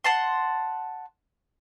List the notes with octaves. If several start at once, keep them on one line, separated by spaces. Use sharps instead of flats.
F#5 A5 C6